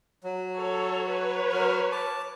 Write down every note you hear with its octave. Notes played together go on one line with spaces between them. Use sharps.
F#3
A4 C#5
B4 C#5
F#3 A#4
A5 D6